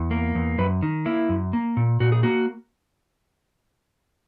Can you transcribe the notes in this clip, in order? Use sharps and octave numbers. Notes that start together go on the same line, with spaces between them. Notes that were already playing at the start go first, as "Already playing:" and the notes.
Already playing: E2
A#3
E2
F#2 B4
D#3
A#3 E4
F#2
A#3
A#2
A#2 F#4
G#4
A#3 F#4